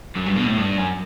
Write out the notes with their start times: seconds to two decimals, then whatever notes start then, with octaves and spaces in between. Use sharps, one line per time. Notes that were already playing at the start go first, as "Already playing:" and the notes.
0.15 F#2
0.26 G2
0.36 B2
0.46 A2
0.57 G2
0.77 F#2